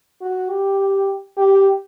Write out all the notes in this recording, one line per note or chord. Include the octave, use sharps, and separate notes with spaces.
F#4
G4
G4